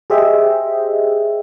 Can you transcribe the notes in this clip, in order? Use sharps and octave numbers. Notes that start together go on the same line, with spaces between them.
G4 G#4 C5 D#5 E5 G5